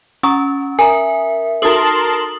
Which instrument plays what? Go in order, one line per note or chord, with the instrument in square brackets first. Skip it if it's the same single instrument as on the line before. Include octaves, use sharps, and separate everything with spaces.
[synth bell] C#4 [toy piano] A#5 C#6 D#6
[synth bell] A#4 [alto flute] E5 [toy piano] G#5 A#5
[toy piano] D#4 F#4 A4 [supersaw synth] A#4 A5 C6 [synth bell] D#6 F#7